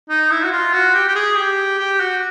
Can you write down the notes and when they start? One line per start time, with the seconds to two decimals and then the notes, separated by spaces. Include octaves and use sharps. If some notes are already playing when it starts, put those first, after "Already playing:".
0.09 D#4
0.31 E4
0.43 F#4
0.52 F4
0.73 F#4
0.94 G4
1.08 G4
1.16 G#4
1.36 G4
1.79 G4
2.00 F#4